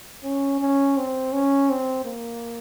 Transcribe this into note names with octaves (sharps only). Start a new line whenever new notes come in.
C#4
C#4
C4
C#4
C4
A#3